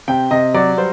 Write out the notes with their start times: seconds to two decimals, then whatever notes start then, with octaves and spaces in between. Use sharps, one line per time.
0.08 C3 G5
0.31 C3 D#5
0.54 F#3 D5
0.77 G3 C5